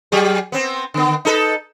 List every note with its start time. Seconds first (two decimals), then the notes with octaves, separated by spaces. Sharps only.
0.12 F#3 G4 G#4
0.52 B3 C4
0.94 D3 B3
1.25 D#4 A4 B4